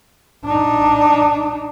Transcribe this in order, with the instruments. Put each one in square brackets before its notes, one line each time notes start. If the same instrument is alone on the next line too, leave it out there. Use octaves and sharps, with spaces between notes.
[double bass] D4 D#4